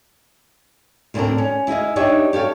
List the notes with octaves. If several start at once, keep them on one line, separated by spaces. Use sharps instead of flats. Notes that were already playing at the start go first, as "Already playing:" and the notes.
D2 A2 D3 C4 D4 A#4
C#4
E4 G#4 D#5 F5
D4 D#4 G4 C#5 D5 E5
G4 A4 C#5 F5